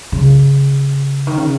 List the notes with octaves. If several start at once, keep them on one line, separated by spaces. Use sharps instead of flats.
C#3
D#3
C#3